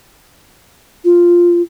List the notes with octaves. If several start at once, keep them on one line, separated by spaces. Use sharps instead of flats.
F4